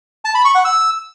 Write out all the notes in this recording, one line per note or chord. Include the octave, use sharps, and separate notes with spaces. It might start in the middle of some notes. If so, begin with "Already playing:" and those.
A5
B5
C#6
F#5
E6